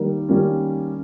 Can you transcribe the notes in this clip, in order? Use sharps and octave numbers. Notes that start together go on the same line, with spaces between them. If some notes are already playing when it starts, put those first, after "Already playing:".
Already playing: D#3 G3 A#3
D#3 G3 A#3 C#4